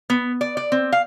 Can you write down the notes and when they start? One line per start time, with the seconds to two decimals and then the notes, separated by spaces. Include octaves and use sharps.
0.10 B3
0.41 D5
0.57 D5
0.72 C4
0.92 F5